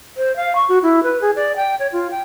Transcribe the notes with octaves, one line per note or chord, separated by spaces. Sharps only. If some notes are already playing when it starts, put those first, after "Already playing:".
C5
F5
C#6
F#4
E4
B4
G#4
D5
G5
C#5
F4
G5